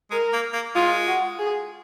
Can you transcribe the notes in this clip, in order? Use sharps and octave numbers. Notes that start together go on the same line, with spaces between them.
G#3 A#4
A#3
A#3
G#3 F4
F#4
G#4